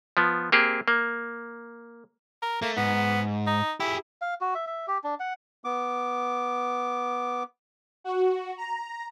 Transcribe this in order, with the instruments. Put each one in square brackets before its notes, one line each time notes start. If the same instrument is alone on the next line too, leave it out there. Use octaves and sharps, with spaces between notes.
[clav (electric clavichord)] F3 B3
A#3 C4 G4 G#4
A#3
[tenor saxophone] A#4
[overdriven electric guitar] A3 [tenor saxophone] A#3
[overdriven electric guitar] G#2 [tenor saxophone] B3
[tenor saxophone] D#4
[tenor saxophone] E4 [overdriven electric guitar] G4 G#4
[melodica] F5
F#4
E5
E5
G4
D4
F#5
[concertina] B3 D6
[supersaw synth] F#4
A#5